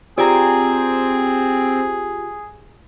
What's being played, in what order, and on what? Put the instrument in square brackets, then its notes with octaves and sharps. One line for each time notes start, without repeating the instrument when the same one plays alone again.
[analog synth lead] C4 [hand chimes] F4 G4 [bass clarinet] G#4 [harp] D5 G#5 A#5